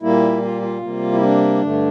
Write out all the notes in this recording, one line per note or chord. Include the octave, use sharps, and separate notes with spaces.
A#2 G3 A#3 E4
F4
F4
C3 G3 A#3
E4
D4
G2 D3 A3